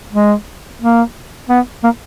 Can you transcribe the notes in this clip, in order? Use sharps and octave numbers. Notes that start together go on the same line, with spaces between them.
G#3
A#3
B3
A#3